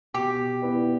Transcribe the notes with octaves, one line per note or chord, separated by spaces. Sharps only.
B2 G4
B3 E4 B4 D5